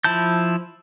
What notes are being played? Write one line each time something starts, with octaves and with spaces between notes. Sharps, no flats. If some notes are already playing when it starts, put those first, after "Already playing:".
F3 E4 A5 G6